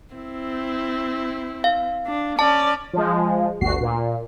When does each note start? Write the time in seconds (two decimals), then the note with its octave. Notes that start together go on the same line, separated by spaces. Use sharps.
0.15 C4 E4
1.64 F5
2.06 D4
2.39 C#4 D5 A5
2.93 F3 G#3
3.61 G1 D2 F#4 C7
3.81 A#2